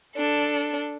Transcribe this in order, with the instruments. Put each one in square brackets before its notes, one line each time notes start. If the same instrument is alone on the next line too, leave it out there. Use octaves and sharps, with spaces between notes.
[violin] D4 A4